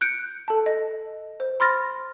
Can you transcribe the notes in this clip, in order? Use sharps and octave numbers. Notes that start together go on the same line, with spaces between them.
F#6 G6 C#7 D7
A4 A5
D#5
C5
B5 C6 F6 A6 A#6